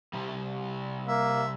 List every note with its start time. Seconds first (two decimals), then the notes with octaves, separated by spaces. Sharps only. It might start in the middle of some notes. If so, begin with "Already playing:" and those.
0.13 C3 G3
1.08 A#3 E5